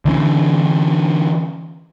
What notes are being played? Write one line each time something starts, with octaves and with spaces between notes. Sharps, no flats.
D3 E3 A#3 C#4